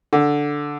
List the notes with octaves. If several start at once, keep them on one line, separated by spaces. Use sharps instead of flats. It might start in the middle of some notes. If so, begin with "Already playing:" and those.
D3